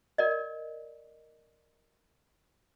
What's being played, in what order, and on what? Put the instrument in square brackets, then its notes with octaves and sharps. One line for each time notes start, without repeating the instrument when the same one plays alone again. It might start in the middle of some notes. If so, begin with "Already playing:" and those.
[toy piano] A#4 D5 D#5